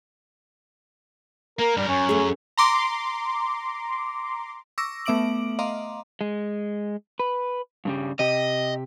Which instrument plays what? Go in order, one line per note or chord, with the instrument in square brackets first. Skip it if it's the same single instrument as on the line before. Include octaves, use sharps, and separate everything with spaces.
[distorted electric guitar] A#3 [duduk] A#4
[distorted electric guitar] G2 A#4 [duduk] G3
[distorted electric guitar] F#2 [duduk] C#4
[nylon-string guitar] A3 G#4
[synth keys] A#5 C6 D6
[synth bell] C#6 D6 E6 A#6
A3 B3 E5 D6 D7 F#7
D#5 F5 A#5 C6 D6
[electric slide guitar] G#3
B4
G2 C#3 G3
[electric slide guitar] C3 G4 [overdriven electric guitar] D#5